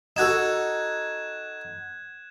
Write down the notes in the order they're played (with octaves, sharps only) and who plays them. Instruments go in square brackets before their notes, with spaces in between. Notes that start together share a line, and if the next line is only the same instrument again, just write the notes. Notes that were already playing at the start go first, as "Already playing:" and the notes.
[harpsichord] D#4 F#4 A4 [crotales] F#6 G#6 E7